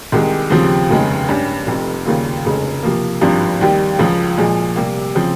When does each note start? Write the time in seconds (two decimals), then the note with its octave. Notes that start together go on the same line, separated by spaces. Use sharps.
0.12 C2 C3 D#3 G#3
0.50 D#2 C#3 F3 C4 G4
0.90 F1 D#2 C#3 G#3
1.28 G2 G3 C#4 G4
1.67 F1 F2 C3
2.06 D#2 C#3 G3 A#3 F4
2.45 F1 F2 C#3 G#3
2.83 C3 F3 A#3
3.21 G#1 G2 F3 C4 G4
3.61 D#2 D#3 G3
3.99 C#2 C#3 F3
4.37 A#2 F3 G#3
4.76 C3 G3 A#3
5.15 C#3 F3 C4